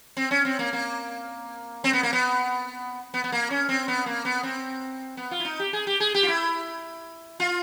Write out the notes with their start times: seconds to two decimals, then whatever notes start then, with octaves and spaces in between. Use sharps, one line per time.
0.17 C4
0.31 C#4
0.45 C4
0.59 A#3
0.73 A#3
1.84 C4
1.93 B3
2.03 A#3
2.13 B3
3.14 B3
3.24 B3
3.32 A#3
3.50 C#4
3.69 C4
3.88 B3
4.06 A#3
4.25 B3
4.43 C4
5.17 B3
5.31 F4
5.40 E4
5.45 D#4
5.60 G4
5.73 G#4
5.87 G4
6.00 G#4
6.14 G4
6.23 F4
6.28 E4
7.40 F4